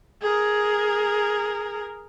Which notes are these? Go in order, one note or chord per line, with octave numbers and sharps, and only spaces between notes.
G#4 A#4